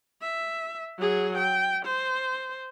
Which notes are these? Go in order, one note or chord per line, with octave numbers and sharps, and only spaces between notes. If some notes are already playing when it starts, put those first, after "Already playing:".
E5
F#3 G#4
G5
C5